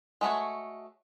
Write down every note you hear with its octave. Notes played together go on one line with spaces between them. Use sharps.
G#3 A3 F#4 C#5